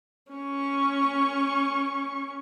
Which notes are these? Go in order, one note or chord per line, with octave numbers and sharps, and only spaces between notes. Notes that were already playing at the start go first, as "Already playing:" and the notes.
C#4 C#6